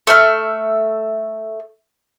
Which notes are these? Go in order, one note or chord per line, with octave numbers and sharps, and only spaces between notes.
A3 E5 F6